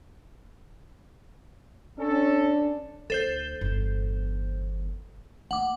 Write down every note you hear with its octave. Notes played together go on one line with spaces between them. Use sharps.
C#4 D4 A4
D2 A4 C5 G6
G1 E2
A3 A#3 F#5 D6